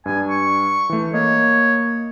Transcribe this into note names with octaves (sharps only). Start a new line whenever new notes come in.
G2 G3 G#5
C#6
E3 A3
A#3 C#5 D#5